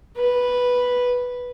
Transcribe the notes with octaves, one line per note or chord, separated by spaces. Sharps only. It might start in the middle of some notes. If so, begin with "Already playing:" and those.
B4